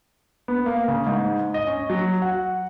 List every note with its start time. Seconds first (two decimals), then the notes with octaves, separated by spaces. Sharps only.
0.48 B3
0.66 A#3
0.88 C#3
1.07 G#2
1.54 D#5
1.67 C#4
1.90 F#3
2.22 F#5